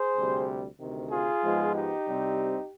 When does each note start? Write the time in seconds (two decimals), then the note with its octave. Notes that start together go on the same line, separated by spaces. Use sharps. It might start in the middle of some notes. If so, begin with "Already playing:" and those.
Already playing: G#4 C5
0.15 D2 C3 G3
0.78 D2 C3 D#3
1.11 F4 G#4
1.42 G#2 F3 G#3 B3
1.74 D#4 G4
2.06 C2 C3 G3 C4